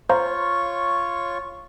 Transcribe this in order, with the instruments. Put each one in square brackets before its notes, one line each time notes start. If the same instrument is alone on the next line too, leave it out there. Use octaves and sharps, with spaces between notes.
[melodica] F4 C#5 C#6 [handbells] C5 F5 A#5